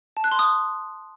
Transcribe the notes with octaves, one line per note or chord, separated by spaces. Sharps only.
A5
F#6
C6
D#6